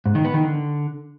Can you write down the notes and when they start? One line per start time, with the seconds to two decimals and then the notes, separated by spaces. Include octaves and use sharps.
0.06 G#2
0.15 D#3
0.25 B3
0.34 D#3
0.44 D3